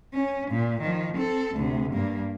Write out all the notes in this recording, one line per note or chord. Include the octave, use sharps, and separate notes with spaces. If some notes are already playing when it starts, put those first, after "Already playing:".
C#4
A#2
D#3 F3
C4 A4
D2 C3
G2 A#3